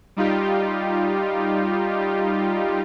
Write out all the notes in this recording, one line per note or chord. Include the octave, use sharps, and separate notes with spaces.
G3 D#4 F4 G4